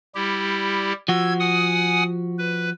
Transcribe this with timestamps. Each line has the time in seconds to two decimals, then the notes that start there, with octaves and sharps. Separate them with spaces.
0.15 G3 E4 G4
1.08 F3 F#4 E6 G#6
1.40 F#5 G#5 D#6
2.38 B4